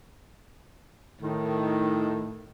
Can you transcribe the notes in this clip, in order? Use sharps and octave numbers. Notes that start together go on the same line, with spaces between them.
A2 D#3